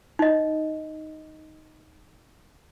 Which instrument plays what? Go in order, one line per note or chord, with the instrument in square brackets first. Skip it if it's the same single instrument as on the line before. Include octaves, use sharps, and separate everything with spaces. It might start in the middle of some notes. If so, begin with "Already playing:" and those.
[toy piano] D#4 D#5